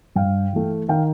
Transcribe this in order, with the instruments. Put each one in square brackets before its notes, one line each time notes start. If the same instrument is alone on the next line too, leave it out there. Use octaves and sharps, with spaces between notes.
[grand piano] G2 F5 G5
E3 A3
D#3 F5 G5